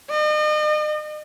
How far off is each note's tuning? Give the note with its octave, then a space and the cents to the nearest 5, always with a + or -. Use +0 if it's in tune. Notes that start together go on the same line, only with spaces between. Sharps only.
D#5 -40